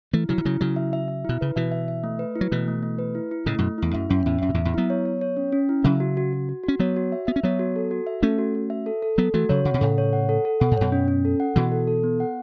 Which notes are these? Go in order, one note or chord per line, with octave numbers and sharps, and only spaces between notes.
E3 A3 E4
C#3 F#3 E4
E3
C#3 F#3 E4
C#3 F#3 E4
E5
E5
E5
B2 E4
C#3 B4
B2 E3 E5
E5
E5
A3
B4
E4
F#3
B2 E3 A3
A3
A3
B4
E4
E4
A2 C#3 A3
F#2 B2
A3
E2 E4
F#2 E5
F#2 C#4
E2 A2 E5
F#2 E5
B2
E2 A2
E5
E2 A2
F#3 B3 E4
C#5
C#5
C#5
C#4
C#4
E4
C#3 F#3 E5
F#4
F#4
F#4
F#4
C#4 F#4
F#3 B3 C#5
F#4
E5
B3 E5
C#4
F#3 B3 C#5
F#4
A4
F#4
E5
A3 C#4 A4
F#4
F#4
E5
A4
A4
F#3 B3 A4
E3 A3 F#4
C#3 F#3 C#5
C#3 F#5
B2
A2 C#3 A4
C#5
F#5
A4
A4
B2 F#5
A2
F#2 B2 C#5
C#4
C#4
A4
F#5
B2 E3 F#4
A4
A4
B3
F#5